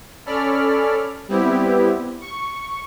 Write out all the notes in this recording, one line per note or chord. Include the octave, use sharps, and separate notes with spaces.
C#4 A4 D5 B5 F6
G3 B3 C4 E4 G4
C#6